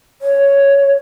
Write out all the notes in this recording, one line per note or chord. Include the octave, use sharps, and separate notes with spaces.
C#5